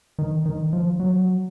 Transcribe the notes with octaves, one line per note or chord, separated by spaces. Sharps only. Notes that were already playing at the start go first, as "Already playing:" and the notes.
D#3
D#3
F3
F#3